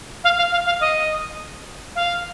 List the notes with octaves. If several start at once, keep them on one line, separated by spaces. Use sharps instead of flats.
F5
F5
F5
F5
D#5
F5